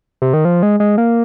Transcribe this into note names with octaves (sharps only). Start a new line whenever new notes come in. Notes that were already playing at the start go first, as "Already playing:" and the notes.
C3
D#3
F3
G#3
G#3
A#3